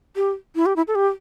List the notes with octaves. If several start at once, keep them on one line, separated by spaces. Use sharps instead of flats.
G4
E4
G4
E4
A4
G4